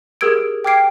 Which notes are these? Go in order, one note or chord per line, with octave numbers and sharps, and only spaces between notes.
G4 G#4 A#4 E6 G#6 D7
G5 D6 F6 G#6 C7 D7